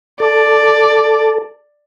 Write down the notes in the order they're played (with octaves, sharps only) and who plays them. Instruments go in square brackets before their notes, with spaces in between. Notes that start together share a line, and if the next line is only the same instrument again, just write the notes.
[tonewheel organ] A4 [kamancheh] D5